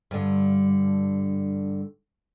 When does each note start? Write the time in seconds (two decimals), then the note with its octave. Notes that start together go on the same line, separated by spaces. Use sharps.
0.11 G2 D3